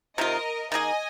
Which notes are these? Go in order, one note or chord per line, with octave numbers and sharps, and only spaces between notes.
C3 D#3 C4 F4 A#4 D#5
D#3 A#3 G#4 D#5 G#5